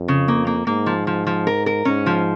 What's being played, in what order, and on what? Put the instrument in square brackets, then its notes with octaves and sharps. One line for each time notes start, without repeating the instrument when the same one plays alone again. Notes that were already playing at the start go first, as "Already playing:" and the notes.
Already playing: [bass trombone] F2
[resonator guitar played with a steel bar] C#3
A#3
A#3
[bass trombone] G#2 [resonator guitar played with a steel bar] A#3
[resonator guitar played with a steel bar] F3
F3
F3
A#4
A#4
[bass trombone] G#2 [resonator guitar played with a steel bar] C#4
[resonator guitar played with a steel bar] F3